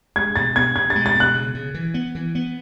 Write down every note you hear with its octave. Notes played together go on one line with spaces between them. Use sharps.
G#3 G#6
B2 A6
B3 G#6
B2 G#6
A6
G#3
A6
B2
F#6
C#3
C#3
E3
B3
E3
B3